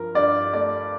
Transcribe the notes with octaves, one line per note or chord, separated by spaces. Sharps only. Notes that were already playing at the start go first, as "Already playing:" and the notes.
Already playing: G2 F3 A#4
G2 D5
A3 D5